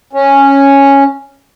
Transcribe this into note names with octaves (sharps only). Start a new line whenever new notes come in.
C#4